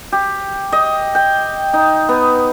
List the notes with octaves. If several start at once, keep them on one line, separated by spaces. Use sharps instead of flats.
G4
D#5
G5
D#4
B3